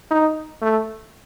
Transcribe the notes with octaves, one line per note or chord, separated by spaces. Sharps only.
D#4
A3